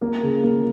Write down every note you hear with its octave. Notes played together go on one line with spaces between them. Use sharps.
A#3 A#4
C#3
A#3